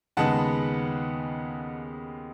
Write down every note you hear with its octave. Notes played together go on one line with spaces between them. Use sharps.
D#2 C#3 G#3 B3 D#4 F#5 A5